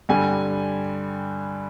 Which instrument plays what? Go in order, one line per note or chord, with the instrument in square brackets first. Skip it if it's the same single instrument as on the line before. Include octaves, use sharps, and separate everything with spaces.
[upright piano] G2 D3 G3 G#5